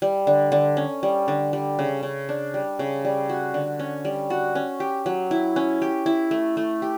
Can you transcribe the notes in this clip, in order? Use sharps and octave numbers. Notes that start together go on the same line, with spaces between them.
G3
D3
D3
C#4
G3
D3
G3
C#3
C#3
D4
G3
C#3
G3
F#4
D3
C#4
G3
F#4
C#4
G4
F#3
E4
C#4
G4
E4
A3
A3
G4